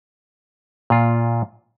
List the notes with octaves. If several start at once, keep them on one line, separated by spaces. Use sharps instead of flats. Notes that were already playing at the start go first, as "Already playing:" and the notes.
A#2 F4